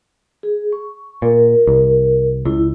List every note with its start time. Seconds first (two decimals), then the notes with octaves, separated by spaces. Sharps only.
0.43 G#4
0.73 C#6
1.22 A#2 A#4
1.67 C2
2.45 C#2 E4